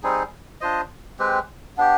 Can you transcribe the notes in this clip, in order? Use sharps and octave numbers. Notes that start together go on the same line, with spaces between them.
G3 C4 D#4 G#4
D4 F4 C5 D#5
G#3 C4 G4 B4
B3 D4 G4